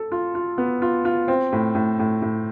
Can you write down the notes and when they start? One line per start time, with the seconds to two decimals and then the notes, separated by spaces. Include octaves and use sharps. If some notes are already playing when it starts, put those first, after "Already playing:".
Already playing: A4
0.12 F4
0.35 F4
0.58 B3
0.82 F4
1.05 F4
1.28 C4
1.52 A2
1.75 A2
1.99 A2
2.22 A2